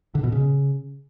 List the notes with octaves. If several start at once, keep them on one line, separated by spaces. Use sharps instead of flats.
D3
B2
C#3